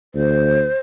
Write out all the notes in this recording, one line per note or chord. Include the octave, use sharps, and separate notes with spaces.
D2 C5